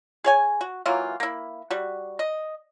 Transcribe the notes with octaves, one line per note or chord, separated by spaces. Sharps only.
G#4 C#5 G#5
F#4
E3 F#3 A#3 F4
A#3 E4
G3 F#4
D#5